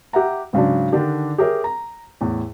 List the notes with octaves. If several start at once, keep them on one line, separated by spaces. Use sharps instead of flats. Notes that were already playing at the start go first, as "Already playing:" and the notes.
G4 E5 F#5 A#5
G#2 C#3 F#3 D4
D3 D#3 D4 G4
G4 G#4 A#4 C#5 E5
A#5
E2 A2